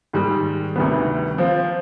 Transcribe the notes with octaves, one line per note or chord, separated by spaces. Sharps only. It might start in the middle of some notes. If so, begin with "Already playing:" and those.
G#2 D#3 G3
D2 C3 D#3 G3 B3
F3 C4 F4